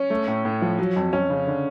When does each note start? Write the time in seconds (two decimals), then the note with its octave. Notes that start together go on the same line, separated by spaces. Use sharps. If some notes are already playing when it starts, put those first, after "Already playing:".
Already playing: C#4
0.10 A3
0.28 A2
0.45 A2
0.62 F3
0.79 F#3
0.96 F2
1.13 F2 C#4
1.30 C#3
1.47 D3